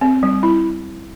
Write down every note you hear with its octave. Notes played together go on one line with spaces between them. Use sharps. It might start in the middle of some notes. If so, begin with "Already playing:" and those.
C4
G3
E4